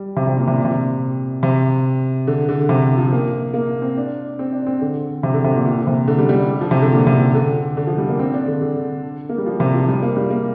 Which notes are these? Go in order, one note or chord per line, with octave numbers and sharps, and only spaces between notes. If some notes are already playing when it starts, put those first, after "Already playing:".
Already playing: G3
C3
C3
A#2
C3
A#2
C3
C3
D3
D3
C3
F3
A#3
A#3
C4
D4
C4
D4
C4
D3
C3
D3
C3
A#2
A#2
C3
D3
G3
G3
F3
C3
D3
A#2
C3
D3
D3
F3
G3
A#3
C4
D4
D3
D3
A#3
G3
F3
C3
F3
G3
A#3
G3
A#3